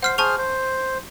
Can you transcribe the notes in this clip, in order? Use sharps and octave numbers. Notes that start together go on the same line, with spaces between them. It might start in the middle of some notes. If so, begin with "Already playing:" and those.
C5 F#5 F6 C7
G#4 C5 A5 C#6 F6 F7
C5